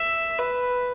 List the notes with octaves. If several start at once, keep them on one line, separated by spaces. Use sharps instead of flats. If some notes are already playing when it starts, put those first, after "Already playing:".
Already playing: E5
B4